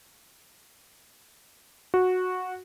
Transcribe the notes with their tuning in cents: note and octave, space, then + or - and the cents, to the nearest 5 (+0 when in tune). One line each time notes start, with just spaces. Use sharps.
F#4 -10